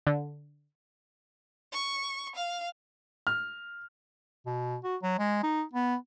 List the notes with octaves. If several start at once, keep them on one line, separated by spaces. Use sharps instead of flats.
D3
C#6
F5
F6
B2
F#4
F#3
G#3
D#4
B3